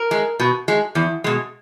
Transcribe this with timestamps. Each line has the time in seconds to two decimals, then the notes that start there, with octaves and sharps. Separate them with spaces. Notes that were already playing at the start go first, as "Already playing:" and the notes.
Already playing: A#4
0.11 G#3
0.40 B2
0.68 G#3
0.95 E2
1.24 B2 G#3